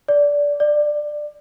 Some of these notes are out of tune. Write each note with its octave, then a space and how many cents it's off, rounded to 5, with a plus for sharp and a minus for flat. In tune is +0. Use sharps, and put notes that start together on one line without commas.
D5 -15
D5 +15